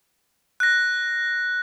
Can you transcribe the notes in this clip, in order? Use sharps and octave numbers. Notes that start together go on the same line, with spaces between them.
F#6 A#6